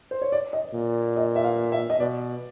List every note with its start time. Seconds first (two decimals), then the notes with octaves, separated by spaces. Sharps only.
0.11 C5
0.22 C#5
0.32 D5
0.53 D#5
0.74 A#2
1.16 D#5
1.36 E5
1.44 F5
1.72 E5
1.90 D#5
1.99 B2 D5